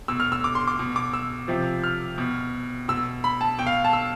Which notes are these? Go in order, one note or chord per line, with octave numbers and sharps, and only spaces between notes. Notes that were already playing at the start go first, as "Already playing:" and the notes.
B2 E6
F6
E6
D6
C6
D6
B2
D6
E6
C3 F3
F6
B2
B2 E6
B5
A5
B2 G5
F5
A5
E6